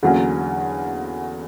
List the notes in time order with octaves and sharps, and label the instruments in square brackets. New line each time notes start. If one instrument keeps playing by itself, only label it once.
[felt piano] E2 D3 F#3 A#3 C#4